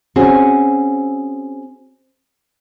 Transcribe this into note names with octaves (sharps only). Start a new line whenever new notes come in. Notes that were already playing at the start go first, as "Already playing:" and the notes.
C4 C#4 F#4 G#4